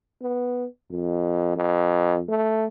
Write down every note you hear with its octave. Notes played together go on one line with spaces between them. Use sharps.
B3
F2
F2
A3